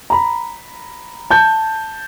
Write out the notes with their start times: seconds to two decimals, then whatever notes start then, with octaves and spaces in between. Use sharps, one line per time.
0.10 A#5 B5
1.31 A5 G6